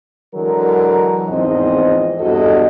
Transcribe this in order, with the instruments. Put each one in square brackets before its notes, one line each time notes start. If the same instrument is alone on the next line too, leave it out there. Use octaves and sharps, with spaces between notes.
[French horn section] D3 E3 F#3 G#3 A#4
E2 G#2 E3 F3 C4 D#5
E2 G2 F#4 A4 D#5